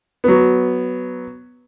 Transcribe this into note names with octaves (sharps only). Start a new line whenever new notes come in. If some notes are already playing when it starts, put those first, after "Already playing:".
F#3 B3